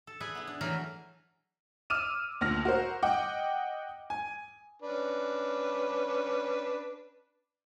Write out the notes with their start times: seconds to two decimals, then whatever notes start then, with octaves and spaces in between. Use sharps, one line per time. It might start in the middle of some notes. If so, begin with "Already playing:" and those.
0.07 A4
0.20 G#4 B4 D5 E5
0.35 B3 E4
0.47 D4
0.61 E3 F#3 A3 A#4
1.90 D6 E6 F6 D#7 E7
2.41 D2 A#2 F6 A#6
2.65 F#4 A#4 C5
3.03 D#5 F#5 G5 D6
4.10 G#5
4.82 C#4 D4 B4